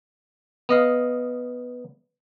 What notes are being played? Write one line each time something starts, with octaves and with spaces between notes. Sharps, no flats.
B3 D#5 F5